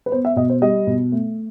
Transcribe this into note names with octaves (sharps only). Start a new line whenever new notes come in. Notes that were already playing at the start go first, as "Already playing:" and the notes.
B4
B3 C5
E5
B2 D#5
C5
G3 D#5
B2
A3